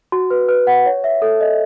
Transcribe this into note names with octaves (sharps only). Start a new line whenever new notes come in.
F#4
B4
B4
F#5
C#5
E5
A4
D#5